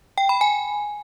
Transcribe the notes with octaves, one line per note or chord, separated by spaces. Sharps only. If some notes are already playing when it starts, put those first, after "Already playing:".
G5
B5
G#5